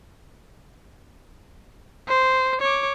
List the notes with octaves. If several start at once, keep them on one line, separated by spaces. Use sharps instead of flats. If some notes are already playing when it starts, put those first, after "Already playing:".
C5
C#5 D6